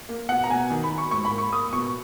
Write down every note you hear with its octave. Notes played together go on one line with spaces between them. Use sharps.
A#3
B2 F#5
A#5
B2 G#5
D#3
B5
F#3
C#6
G#2 C#6
B5
A#3
C#6
A#3 D#6
B2 C#6